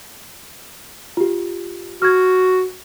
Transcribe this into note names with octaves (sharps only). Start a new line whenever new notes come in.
F4 G4
F#4 F6 G#6